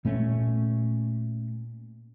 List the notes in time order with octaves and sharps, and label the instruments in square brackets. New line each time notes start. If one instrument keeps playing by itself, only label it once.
[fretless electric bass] A#2 A3 C#4